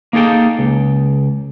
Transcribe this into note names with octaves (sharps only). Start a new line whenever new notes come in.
A#3 D#4 G#4 A4 G5
C#2